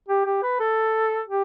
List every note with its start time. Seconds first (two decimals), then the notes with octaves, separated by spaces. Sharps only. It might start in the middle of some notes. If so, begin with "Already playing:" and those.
0.09 G4
0.25 G4
0.43 B4
0.60 A4
1.28 G4